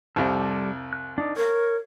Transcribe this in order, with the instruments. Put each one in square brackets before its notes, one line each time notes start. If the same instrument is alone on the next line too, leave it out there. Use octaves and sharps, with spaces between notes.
[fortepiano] C2 F2 C3 [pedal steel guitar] G3 A4
[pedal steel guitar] F#6
D4 D#4 D5
[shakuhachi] A#4 [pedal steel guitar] C#5